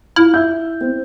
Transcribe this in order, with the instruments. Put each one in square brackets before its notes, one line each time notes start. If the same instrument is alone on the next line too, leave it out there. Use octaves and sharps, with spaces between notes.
[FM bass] E4 [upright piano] F4 F6
[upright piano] E5 E6 G6
C4